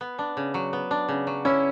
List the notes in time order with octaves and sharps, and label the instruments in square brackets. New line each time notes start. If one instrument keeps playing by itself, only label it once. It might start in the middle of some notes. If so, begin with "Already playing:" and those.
[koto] B3
D4
C#3
F#3
B3
D4
C#3
F#3
[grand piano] C#4 [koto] E4